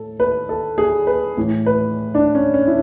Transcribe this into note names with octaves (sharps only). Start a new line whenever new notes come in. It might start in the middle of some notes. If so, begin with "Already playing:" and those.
Already playing: A2 A4
B4
A4
G#4
B4
A2 E3
B4
D4
C#4
C#4
E4